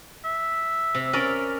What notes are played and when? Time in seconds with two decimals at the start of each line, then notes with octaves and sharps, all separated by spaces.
0.25 E5
0.95 C3
1.13 C#4 A#4 D5